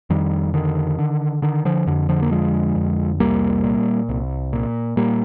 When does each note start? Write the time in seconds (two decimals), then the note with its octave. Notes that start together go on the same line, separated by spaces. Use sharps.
0.10 F2 D#3 G3
0.54 D3 D#3
0.98 D3
1.42 D3 D#3
1.65 D3 F3
1.87 F2 D3
2.09 D3 F3
2.22 A#3
2.31 D3 F3 G#3
2.76 F2
3.20 C2 G3 A#3
3.64 A#2
4.09 C2
4.53 A#2
4.97 A#2 G3 A#3